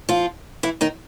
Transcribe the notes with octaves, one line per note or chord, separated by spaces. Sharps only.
F3 F4
E3 E4
D#3 D#4